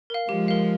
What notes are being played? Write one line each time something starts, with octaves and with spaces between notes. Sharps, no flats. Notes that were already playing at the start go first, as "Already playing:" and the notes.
A#4 F5
F3 G#3 G4
A#4 F5